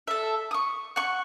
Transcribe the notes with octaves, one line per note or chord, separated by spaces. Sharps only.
A4 E5
C#6 D#6
F#5 C#6